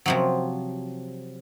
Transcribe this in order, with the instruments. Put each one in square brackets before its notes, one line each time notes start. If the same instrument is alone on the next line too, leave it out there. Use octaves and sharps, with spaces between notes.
[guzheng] C3 F3 F#3